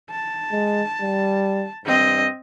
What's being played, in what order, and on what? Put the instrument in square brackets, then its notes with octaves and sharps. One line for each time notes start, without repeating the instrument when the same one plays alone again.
[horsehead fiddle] A5
[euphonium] G#3
G3
[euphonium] G2 [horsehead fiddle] C4 D#5